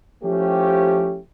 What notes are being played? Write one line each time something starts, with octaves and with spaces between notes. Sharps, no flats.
F3 A3 C#4 E4 G4